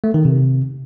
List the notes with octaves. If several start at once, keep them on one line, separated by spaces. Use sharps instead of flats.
A3
D#3
C3